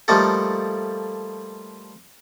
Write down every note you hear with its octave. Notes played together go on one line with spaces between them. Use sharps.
F3 G3 A3 A#3 D#4 A4